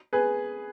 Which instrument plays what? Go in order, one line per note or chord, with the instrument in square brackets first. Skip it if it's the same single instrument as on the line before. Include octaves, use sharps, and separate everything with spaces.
[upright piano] G#4 B4